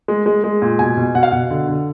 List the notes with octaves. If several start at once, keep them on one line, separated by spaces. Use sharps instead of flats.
G#3
G#3
G#3
A#2
B2 G#5
B2
B2 F#5
F5
B2 F#5
D3
D3